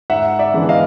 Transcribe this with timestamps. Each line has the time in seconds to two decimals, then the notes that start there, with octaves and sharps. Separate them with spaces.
0.10 G#2 E5 F#5
0.39 D5 E5
0.54 E3 G#3 B3 D4
0.69 D#5 F5